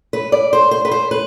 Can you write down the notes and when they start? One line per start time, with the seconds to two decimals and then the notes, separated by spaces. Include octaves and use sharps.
0.13 B4
0.32 D5
0.53 C5
0.71 C5
0.85 B4
0.91 C5
1.11 B4